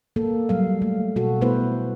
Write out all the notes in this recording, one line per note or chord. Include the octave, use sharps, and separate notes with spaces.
A#3 A4
F#3 G3 F5
A3
B2 F#4 A4
A3 B3 E4 B4 C5